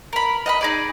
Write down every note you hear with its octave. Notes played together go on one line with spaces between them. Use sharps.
A#4 B5
D#5 F#5 B5
D#4 G#4 D5